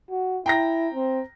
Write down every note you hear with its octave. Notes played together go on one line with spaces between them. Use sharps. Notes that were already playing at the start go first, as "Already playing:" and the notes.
F#4
E4 G5 A#5 A#6
C4